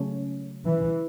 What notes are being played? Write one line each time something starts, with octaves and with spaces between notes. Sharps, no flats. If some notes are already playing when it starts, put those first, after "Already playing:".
Already playing: C#3 F#3 A3 C#4
E3